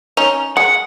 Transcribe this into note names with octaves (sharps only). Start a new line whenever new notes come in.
C#4 D#4 F7
G#3 F#5 C#7